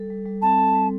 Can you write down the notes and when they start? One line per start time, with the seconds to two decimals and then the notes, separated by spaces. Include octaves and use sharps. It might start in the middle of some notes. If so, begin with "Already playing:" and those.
Already playing: G3 A4
0.10 G3
0.26 G3
0.42 C4 A5
0.59 A4
0.75 G3